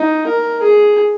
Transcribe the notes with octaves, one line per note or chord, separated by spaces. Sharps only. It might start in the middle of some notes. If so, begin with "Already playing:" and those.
Already playing: D#4
A#4
G#4